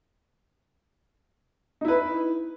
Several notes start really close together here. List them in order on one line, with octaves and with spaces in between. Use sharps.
D#4 E4 B4